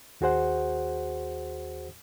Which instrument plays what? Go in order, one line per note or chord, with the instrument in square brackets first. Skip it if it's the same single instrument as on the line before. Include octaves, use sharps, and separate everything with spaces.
[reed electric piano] D#2 F#4 G#4 C5 F#5